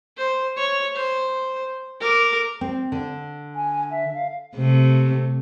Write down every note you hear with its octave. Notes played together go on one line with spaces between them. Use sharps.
C5
C#5
C5
A#4 D6
C4
D3
G#5
E5
F5
C3 A3